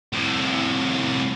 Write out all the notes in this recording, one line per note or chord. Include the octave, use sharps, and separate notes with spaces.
C2 A2